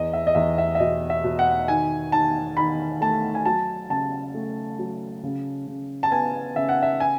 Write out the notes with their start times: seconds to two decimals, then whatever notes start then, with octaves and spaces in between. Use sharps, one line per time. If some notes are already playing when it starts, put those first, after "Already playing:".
Already playing: E2 D#5
0.13 E5
0.27 D#5
0.35 E2 E5
0.58 E5
0.75 E5
0.80 B2 D#5
1.10 E5
1.24 B2
1.39 F#5
1.68 D#3 G#5
2.12 D#3 A5
2.57 D#3 B5
3.01 A3 A5
3.35 G#5
3.45 F#3 A5
3.90 C#3 A5
4.34 A3
4.79 F#3
5.23 C#3
5.67 C#3
6.03 A5
6.11 B3 G#5
6.56 C#3 E5
6.69 F#5
6.83 E5
7.00 G#5